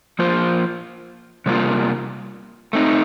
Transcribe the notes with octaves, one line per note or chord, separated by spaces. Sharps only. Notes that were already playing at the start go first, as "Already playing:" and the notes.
F3 A#3 F4 C5
C3 G3 A#3 F4
A3 C4 D#4